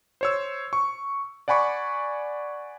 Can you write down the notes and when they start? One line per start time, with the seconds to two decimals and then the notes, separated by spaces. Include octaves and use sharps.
0.21 C5 C#5 E6
0.73 C#6
1.48 D5 F#5 G#5 B5 C#6 D6